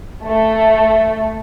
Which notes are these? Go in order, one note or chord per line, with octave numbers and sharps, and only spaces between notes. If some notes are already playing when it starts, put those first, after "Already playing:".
A3